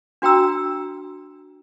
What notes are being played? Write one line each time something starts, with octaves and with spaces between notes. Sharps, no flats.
D4 F#4 G5 A#5 E6